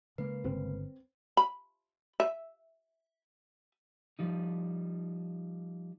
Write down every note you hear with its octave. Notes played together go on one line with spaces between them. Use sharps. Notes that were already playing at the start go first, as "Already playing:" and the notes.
C#3 G#3 A#3 B4
G1 C4
B5
E5
F3 G3 D#4